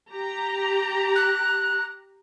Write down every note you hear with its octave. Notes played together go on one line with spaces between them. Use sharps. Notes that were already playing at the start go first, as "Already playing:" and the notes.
G4 A#5
F#6